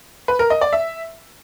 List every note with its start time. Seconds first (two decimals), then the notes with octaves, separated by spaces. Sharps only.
0.28 B4
0.39 A#4
0.50 D#5
0.61 D5
0.73 E5